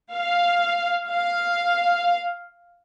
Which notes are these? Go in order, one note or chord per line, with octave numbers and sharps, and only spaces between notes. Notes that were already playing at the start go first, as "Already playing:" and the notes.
F5
F5